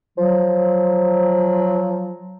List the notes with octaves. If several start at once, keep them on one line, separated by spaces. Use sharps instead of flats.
F3 F#3